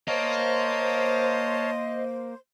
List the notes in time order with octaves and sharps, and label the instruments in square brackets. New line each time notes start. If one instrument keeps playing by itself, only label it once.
[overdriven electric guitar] A#3 [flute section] C5 [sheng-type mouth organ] C#5 F5 A5 [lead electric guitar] D#5